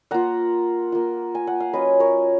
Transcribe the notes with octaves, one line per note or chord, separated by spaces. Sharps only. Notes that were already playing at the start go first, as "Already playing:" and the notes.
A#3 F4 F#5 A#5
A#3 F4
G#5
F#5
F5
F#3 C#4 F4 B4 D#5
A#4 C#5